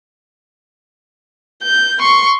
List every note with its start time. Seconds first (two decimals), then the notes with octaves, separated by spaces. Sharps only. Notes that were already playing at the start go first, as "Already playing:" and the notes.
1.63 G6
1.99 C6 C#6